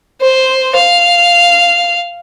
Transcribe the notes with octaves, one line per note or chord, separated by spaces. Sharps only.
C5
F5